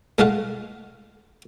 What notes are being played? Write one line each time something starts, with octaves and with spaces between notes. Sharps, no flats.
G#3 A3 F5 F#5